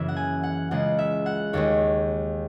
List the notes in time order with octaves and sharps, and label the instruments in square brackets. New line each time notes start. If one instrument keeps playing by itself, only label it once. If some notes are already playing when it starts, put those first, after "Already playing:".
Already playing: [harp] F#2 C#3 E3 A#3 E5
F#5
G#5
F#5
C#2 C#3 G#3 F#5
E5
F#5
D#2 D#3 G#3 C#5